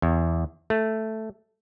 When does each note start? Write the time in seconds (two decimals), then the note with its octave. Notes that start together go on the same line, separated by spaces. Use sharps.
0.02 E2
0.70 A3